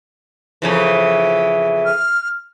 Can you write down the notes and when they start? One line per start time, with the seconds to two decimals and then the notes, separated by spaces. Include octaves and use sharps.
0.62 F2 C#3 E3
1.86 F6